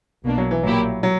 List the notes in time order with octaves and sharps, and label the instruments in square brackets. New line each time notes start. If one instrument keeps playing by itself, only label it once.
[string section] B1 B2 A#3 D4
[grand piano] F#3
E3
[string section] A#1 A#2 A#3 E4 G4 [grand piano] F#3
[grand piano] F#3